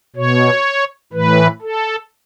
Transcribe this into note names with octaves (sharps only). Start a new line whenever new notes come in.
B2 C#5
A2 E3 B4
A4